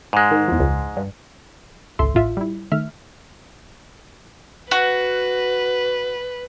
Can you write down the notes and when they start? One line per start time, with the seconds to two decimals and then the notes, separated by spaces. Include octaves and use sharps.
0.13 G#2 G#3
0.31 D#3
0.48 E2 F3
0.59 C#2
0.96 G2
1.99 G#1 C#2 A4 E5 C6
2.14 A1 A2 F4 E5
2.37 G3 E4
2.72 D#3 A3 E5 F6
4.71 F#4 B4